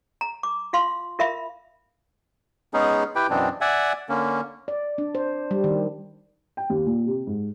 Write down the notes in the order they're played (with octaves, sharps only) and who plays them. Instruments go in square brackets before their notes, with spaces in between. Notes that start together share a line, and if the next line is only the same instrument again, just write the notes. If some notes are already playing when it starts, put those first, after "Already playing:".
[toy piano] A#5
D6
F4 F5 C6
F4 A#4 E5 F5 B5
[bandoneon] G#3 B3 C#4 D#4 G#4
E4 G4 B4 G5
F#2 B2 E3 B3 C4 D4
D5 E5 F#5 G#5
D3 A#3 C#4
[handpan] D5
D4
C5
G3
D#3
[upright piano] G5
D#2
A#2
C3
G#2